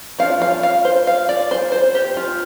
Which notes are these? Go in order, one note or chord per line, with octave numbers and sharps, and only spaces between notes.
F3 D4 F5
F5
F5
C5
F5
D5
C5
C5
G4
F4